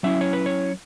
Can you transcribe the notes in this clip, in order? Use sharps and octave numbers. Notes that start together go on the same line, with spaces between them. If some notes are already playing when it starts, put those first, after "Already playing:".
F#3 C#4 E4 E5
C#5
B4
C#5